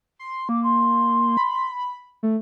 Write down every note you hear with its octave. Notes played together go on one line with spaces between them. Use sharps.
C6
A#3 D6
C6
B5
A3